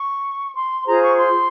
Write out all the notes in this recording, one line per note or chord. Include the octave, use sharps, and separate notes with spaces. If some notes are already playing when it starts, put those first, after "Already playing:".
Already playing: C#6
C6
F4 G#4 C5 A#5
C#6
C6